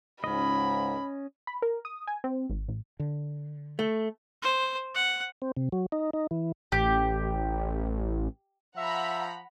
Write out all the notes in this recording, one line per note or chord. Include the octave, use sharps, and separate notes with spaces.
C#2 G#2 C#4 D#5 B5
B5
A#4
D#6
G#5
C4
G#1
A1
D3
A3
C5
F#5
C4
C3
F#3
D#4
D#4
E3
A1 G4
F3 E5 F#5 A#5 B5